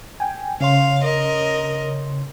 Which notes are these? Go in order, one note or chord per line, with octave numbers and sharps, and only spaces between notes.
G5 G#5
C#3 C#5 F5 C6
A#4 D#5